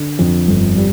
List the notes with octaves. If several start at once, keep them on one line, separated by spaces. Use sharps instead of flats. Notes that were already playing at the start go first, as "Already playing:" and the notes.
Already playing: D3
F2
G1
G3